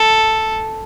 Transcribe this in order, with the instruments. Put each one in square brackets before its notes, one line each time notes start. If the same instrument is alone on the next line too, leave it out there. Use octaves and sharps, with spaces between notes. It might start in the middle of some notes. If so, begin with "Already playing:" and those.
Already playing: [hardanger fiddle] A4